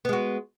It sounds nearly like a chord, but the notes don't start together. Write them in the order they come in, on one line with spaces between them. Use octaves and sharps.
B3 G#3 F#4